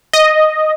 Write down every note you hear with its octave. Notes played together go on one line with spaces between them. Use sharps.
D#5